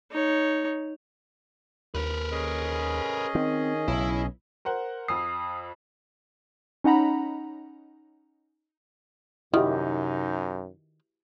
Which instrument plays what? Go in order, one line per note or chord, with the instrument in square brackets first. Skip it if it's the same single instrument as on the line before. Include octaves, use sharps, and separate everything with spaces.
[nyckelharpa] D#4 C#5
[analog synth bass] D#2 [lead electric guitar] A#4 B4
[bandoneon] C#4 G#4 D#5
[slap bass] D#3 [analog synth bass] C4
[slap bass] B1 [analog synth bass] C#3 [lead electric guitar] E4
[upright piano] A#4 C5 F#5
[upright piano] F2 E6 C7 [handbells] D#6
[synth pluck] C#4 D#4 F#5 A#5 B5
[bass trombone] F#2 [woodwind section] C3 D#4 [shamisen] D#3 [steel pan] E4 F#4 G4